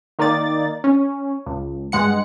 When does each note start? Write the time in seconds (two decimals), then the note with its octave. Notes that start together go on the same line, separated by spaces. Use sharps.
0.19 D#3 A#3 D#4 D5 A6
0.84 C#4
1.46 C#2
1.92 G2 G#3 F#5 C#7